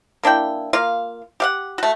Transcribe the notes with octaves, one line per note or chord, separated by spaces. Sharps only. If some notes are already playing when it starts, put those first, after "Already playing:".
A#3 D4 E4 G5
A#3 F4 F5
G4 F5 F#5
A3 F#4